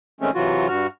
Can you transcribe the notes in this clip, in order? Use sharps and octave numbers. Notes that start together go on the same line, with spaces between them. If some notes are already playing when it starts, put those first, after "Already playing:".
D#3 G#3 A3 C4 C#4
C3 E3 F#3 F4 F#4
G2 F#4 F6